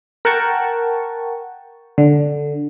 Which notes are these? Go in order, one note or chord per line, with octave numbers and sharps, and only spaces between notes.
A#4 F#5 G5 A5 C#6
D3